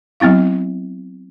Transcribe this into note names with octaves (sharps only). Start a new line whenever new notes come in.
F#3 B3 C4 E4 F5